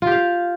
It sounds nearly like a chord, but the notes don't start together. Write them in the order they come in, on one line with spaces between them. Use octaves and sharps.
F4 G4 F5